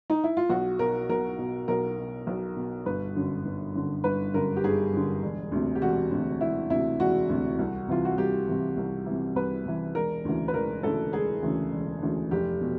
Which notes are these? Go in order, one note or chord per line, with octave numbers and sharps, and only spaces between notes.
D#4
E4
F4
B1 F#4
B2 A#4
B1 A#4
B2
B1 A#4
B2
B1
B2
G1 B4
F#2 D3
G1
F#2 D3
G1 B4
F#2 D3 A#4
G4
G1 G#4
F#2 D3
E1
D2 C3
G4
E1 F#4
D2 C3
E1 E4
D2 C3 E4
E1 F#4
D2 C3
C2
C3 E3 F4
F#4
C2 G4
C3 E3
C2
C3 E3
C2 B4
C3 E3
E1 A#4
D2 C#3 E3
B4
E1 A#4
D2 C#3 E3 A4
E1 G#4
D2 C#3 E3
E1
D2 C#3 E3
F1 G4
B2